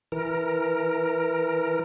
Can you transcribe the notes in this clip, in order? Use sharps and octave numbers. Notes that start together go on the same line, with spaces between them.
E3 A#4